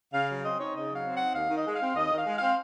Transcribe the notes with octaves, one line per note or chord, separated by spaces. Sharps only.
C#3 F5
F#3
C4 D#5
D#4 C#5
C#3 D#5
F#3
F5
C4
D#4 F#5
D#2 F5
D#3
D#5
G#3
F5
C4
D#2 D#5
D#3
F5
G#3
C4 F5